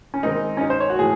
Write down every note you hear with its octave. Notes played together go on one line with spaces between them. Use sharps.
C#4
D#3 G#3 C4 D#4
C#4
D#4
C5
C#5
F#4
A2 E3 G#4